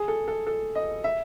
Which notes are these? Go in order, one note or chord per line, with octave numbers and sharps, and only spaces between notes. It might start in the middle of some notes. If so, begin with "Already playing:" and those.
Already playing: G#4
A4
A4
A4
D#5
E5